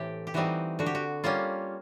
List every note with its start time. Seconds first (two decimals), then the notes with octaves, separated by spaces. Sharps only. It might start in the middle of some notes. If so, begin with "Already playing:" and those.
Already playing: A2 E3 C4 G4
0.27 G4
0.34 E3 G3 C4 D#4 F#4
0.79 D3 F#4
0.86 G4
0.95 F#4
1.24 G3 A#3 C#4 F4